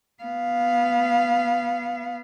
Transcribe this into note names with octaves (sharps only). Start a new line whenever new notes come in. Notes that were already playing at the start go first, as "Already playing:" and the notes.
B3 F5